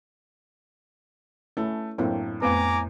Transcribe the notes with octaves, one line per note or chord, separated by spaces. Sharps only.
A3 C#4 E4 A4
F#2 A2 A#3 C4 D4
F2 A3 B3 C4 B4 G#5 A#5 D6